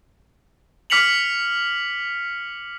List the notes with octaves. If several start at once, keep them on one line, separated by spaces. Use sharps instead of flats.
D6 F6 B6 C#7 F7 F#7